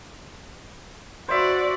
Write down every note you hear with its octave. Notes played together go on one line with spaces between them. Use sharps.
F#4 C5 D5 E5